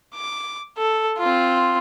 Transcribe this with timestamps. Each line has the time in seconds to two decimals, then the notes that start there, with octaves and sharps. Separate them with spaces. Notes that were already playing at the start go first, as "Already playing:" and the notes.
0.15 D6
0.78 A4
1.19 C4 F4